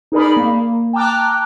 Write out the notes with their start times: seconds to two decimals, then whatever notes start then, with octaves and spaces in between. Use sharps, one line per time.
0.12 D#4 G#4 A#4 D5 B5
0.37 A#3
0.93 G5 A5 A#5 D6 F6 F#6